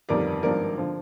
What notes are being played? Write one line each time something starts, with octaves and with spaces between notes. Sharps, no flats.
G1 F2 D#3 G3 A#4 D5
G#1 G2 F3 A#4 D5
D3 F3